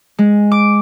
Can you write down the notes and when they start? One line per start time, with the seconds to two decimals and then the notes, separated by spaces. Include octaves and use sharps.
0.19 G#3
0.52 D6